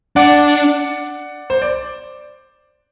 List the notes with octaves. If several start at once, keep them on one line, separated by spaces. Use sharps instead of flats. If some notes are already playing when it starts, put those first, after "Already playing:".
D4 D5 F#5
C5
D5